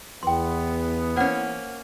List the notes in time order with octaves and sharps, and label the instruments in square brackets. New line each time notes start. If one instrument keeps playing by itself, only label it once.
[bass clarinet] E2 [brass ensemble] E3 B3 [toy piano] G5 C6
[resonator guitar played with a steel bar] A#3 C#4 [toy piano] C5 F#5